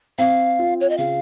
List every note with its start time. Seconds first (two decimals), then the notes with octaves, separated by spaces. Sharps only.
0.18 C4 F5
0.59 F4
0.80 C#5
0.89 D#5
0.97 C#3 F5